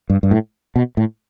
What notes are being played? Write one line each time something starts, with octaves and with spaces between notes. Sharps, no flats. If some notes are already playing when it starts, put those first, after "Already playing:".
G2
G2
A2
B2
A2